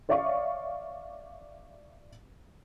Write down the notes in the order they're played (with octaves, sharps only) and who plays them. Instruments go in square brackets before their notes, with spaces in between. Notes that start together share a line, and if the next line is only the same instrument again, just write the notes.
[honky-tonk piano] C#5 D5 E5 F5 C#6